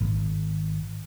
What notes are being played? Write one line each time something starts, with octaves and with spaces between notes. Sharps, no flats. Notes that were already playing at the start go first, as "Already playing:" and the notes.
G#1